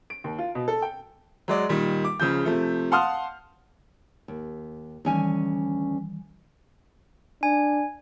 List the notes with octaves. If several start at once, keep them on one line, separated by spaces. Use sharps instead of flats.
D7
D#2
F4
B2
A4
G5
F#3 G#3 D5
A#2 D#3 G3
D6
C#2 C#3 F3 G6
C3 F3 A3
F5 F#5 A5 C6 D#6 F6
D#2
D2 D#3 E3 G3 C#4 G#5
D4 G#5